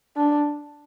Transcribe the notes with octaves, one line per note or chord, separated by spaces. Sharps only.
D4